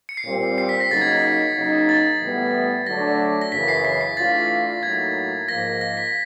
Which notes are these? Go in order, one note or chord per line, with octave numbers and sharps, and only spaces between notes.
C#7
C7
A#2 G3 C4
C7
B6
A#6
C#3 F#3 A#3 D#4 A6
G#6
G#6
C#3 F#3 A#3 D#4
A6
A2 E3 G3 B3 E4
D3 F#3 A3 D4 A#6
A#6
F#2 C#3 E3 B6
C7
B6
C7
E3 A3 D4 F4 A6
A2 F#3 A#3 D#4 G#6
G#2 F3 A#3 A#6
A#6
B6